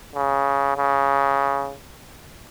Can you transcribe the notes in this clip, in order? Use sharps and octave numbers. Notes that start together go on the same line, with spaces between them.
C#3
C#3